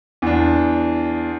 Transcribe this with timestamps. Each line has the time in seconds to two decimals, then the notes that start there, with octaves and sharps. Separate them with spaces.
0.22 E2 D4